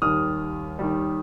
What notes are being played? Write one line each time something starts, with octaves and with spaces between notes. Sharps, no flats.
D#2 D#3 G3 D#6 F6
D#2 D#3 G3